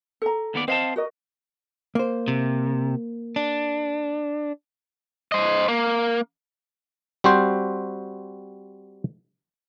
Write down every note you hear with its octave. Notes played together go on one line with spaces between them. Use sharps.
A4 A#5
D#2 B3 D5
C4 C5 D#5 F5 A5
F#4 A#4 D#5
A#3 C5
C3
D4
C5 D#5
A#3
G3 C4 F#4 C5